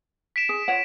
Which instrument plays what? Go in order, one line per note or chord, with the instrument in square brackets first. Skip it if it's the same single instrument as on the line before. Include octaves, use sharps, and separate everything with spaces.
[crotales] B6 D7 E7
[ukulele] G#4
F4 C#5 F#5